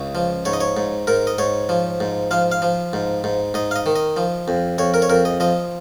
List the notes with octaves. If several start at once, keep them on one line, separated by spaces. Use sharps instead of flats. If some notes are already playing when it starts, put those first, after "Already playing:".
Already playing: C#2 C#3
F3
G#2 C#5
D#5
C#5
G#2
G#2 A#4
D#5
G#2 C#5
F3
G#2
F3 F5
F5
F3
G#2
G#2
G#2 D#5
F5
D#5
D#3
D#5
F3
F2
F2 C#5
A#4
C#5
F2 A#4
D#5
F3 D#5